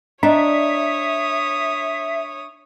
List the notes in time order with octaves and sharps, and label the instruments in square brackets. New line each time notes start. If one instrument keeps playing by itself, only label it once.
[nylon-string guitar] D4 [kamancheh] C#5 D#6 [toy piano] D#5 G5 A#5 [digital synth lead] E5